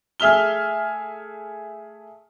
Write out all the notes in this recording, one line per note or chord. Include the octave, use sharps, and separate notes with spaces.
A3 G#4 E5 F6 G7